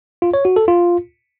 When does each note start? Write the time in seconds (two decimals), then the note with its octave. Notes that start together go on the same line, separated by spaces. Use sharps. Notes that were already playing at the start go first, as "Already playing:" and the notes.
0.22 F4
0.34 C#5
0.45 F#4
0.56 A4
0.68 F4